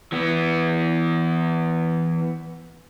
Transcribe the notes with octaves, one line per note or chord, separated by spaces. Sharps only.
E3 B3